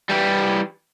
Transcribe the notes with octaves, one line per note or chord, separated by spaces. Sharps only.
E3 G3